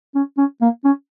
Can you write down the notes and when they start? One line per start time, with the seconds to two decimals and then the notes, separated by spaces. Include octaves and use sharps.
0.15 C#4
0.38 C#4
0.61 A#3
0.85 C#4